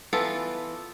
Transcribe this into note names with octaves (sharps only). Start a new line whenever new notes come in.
E3 B3 F4 A4